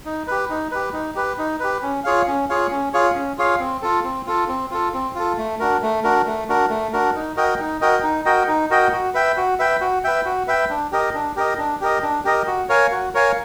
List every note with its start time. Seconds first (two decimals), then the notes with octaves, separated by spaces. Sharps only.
0.05 D#4
0.27 G4 B4
0.50 D#4
0.71 G4 B4
0.93 D#4
1.15 G4 B4
1.38 D#4
1.60 G4 B4
1.82 C#4
2.04 F4 G#4 C#5 F5
2.27 C#4
2.49 F4 G#4 C#5 F5
2.71 C#4
2.93 F4 G#4 C#5 F5
3.15 C#4
3.38 F4 G#4 C#5 F5
3.59 C4
3.82 F4 A4
4.04 C4
4.27 F4 A4
4.48 C4
4.71 F4 A4
4.94 C4
5.15 F4 A4
5.38 A3
5.60 D4 F#4 A#4
5.82 A3
6.04 D4 F#4 A#4
6.26 A3
6.48 D4 F#4 A#4
6.70 A3
6.93 D4 F#4 A#4
7.15 D#4
7.37 F#4 A#4 D#5 G5
7.60 D#4
7.81 F#4 A#4 D#5 G5
8.03 D#4
8.25 F#4 A#4 D#5 G5
8.48 D#4
8.70 F#4 A#4 D#5 G5
8.92 F#4
9.14 B4 E5 G5
9.37 F#4
9.59 B4 E5 G5
9.81 F#4
10.04 B4 E5 G5
10.25 F#4
10.48 B4 E5 G5
10.70 D4
10.92 G4 A#4 D#5
11.14 D4
11.36 G4 A#4 D#5
11.58 D4
11.81 G4 A#4 D#5
12.03 D4
12.25 G4 A#4 D#5
12.47 F#4
12.69 A#4 C#5 F5 G#5
12.92 F#4
13.14 A#4 C#5 F5 G#5